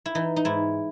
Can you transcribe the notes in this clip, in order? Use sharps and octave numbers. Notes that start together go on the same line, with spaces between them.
E4
E3 D#4
D#4
G#2 E4